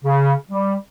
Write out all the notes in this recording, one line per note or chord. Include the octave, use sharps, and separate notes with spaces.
C#3
G3